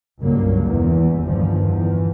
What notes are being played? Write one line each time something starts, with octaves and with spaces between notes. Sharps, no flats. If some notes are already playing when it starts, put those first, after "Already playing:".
C#2 G2 F#3 A#3
E2
G1 G2 D#3 F3
E2